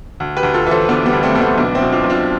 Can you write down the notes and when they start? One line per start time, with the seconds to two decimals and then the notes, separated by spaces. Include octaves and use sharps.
0.20 D2
0.37 G4 B4
0.43 D2
0.54 F4 A4
0.67 E3 A4 C5
0.89 D2 B3 D4
1.06 G3 B3
1.13 D2
1.23 A3 C4
1.35 D2 B3
1.41 A3 C4
1.57 B1 B3 D4
1.75 C4 E4
1.81 B2
1.92 D4 F4
2.04 B1
2.10 D4 F4